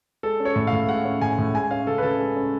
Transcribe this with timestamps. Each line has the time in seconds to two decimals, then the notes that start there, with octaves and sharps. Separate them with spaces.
0.23 G#3 A4
0.40 C#4
0.45 C#5
0.56 A2
0.67 F5
0.72 A2
0.88 G#3 F#5
1.05 C#4
1.21 A2 G#5
1.38 A2
1.54 G#3 G#5
1.71 C#4 F5
1.87 C#3 A4
1.98 B4
2.03 C#3 A4
2.19 G#3
2.36 C#4